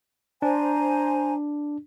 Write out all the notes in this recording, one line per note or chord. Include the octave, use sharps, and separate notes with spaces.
D4 C5 G#5 A#5